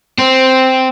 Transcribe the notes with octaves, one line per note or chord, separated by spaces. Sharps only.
C4